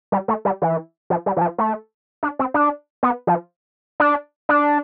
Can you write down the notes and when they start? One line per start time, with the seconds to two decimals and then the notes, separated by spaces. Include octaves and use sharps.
0.12 G3
0.28 A3
0.45 G3
0.62 E3
1.10 F3
1.26 G3
1.37 E3
1.41 F3
1.58 A3
2.23 D4
2.39 C4
2.54 D4
3.03 B3
3.27 F3
4.00 D4
4.49 D4